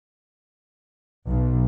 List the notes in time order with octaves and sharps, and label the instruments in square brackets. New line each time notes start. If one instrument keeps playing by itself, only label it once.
[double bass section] B1